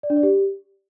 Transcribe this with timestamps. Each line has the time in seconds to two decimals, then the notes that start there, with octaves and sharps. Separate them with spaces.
0.03 D5
0.10 D4
0.16 D5
0.23 G4